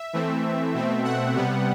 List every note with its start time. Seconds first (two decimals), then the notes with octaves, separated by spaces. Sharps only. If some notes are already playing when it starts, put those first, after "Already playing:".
Already playing: E5
0.13 E3 A3 C4
0.74 B2 A3 C4
1.05 F#5
1.35 C3 G3 B3